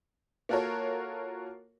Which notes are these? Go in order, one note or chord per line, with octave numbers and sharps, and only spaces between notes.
A#3 F4 F#4 A4 A#4 C#5